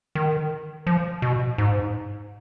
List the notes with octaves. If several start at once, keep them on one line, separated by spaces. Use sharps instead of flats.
D#3
F3
B2
G#2